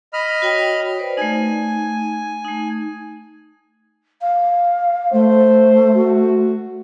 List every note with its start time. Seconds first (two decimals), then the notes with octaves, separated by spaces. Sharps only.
0.13 D#5 B5 F6
0.42 F#4 C#5 G5
0.99 B4 C5 D5
1.17 A3 D#4 G#5
2.44 A3 D#4
4.21 F5
5.12 A3 C5
5.95 F#4